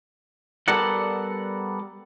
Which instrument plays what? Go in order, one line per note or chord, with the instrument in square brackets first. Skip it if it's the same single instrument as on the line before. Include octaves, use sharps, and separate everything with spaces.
[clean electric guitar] G3 B3 A4 A#4 D5 F#5